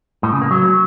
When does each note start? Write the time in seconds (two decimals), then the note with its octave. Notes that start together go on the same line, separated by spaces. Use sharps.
0.23 A2
0.32 C#3
0.42 A#3
0.51 F#3